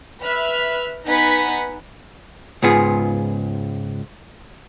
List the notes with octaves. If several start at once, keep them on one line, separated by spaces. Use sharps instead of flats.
B4 E5 F6 F#6
B3 D#4 B4 F#5 G#5 B6
C#2 G#2 B3 F4 G#4